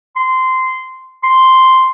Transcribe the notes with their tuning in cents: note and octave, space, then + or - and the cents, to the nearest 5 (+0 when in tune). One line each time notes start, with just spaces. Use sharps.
C6 -15
C6 +0